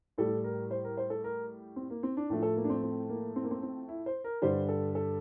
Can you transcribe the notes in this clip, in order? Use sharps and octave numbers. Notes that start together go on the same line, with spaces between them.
A2 G3 A4
A#4
C5
A#4
C5
A4
A#4
C4
A#3
C4
D4
A2 F3 A3 D4
A4
A#3
D4
C4
C4
A#3
C4
A#3
C4
C4
E4
C5
A#4
G2 D3 G3 C5
A4
A4